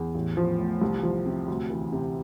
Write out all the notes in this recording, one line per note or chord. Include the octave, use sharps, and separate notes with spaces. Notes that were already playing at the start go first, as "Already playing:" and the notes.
Already playing: E2
A1
F3
A2
C2
F3
C3
D2
E3
C3